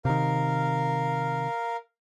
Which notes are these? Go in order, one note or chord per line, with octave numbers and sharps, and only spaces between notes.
C3 D#3 A#4 F5